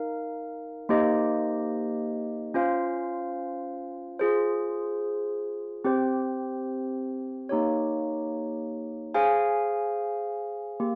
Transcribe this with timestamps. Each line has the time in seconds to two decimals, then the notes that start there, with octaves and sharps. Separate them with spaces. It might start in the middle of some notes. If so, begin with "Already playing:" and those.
Already playing: D#4 A#4 F5
0.89 A#3 D#4 G4 C5 D#5
2.54 C#4 F4 C5 F5
4.19 F4 G#4 C5
5.84 C4 G4 C5
7.49 A#3 D#4 G4 C#5
9.14 G#4 C5 F5 G#5
10.80 A#3 G4